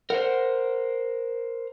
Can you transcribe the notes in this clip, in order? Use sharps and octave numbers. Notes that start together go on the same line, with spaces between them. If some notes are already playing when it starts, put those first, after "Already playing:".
A#4 C5 F#5